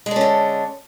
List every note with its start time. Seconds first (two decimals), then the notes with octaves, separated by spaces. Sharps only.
0.06 G#3
0.11 D4
0.16 C#4
0.21 D3